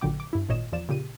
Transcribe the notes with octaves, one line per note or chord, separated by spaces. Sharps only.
A1 A#2 D3 F#3 G5 D6
D6
G2 E4
G#1 A#2 C#5 D#5 E7
E2 F3 D5 E7
A#2 C#3 G4 D#7